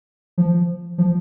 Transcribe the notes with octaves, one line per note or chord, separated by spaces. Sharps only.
F3
F3